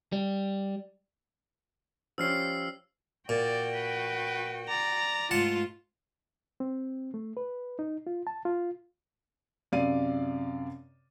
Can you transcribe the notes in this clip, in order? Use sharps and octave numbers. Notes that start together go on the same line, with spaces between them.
G3
F3 G3 C#4 E6 F6 C7
A#2 F#4 D5 G5
B4
D5 A#5
G#2 A3 F4 F#5 A5
C4
A3
B4
D#4
F4
A5
F4
F#2 C3 D5 F5 D#7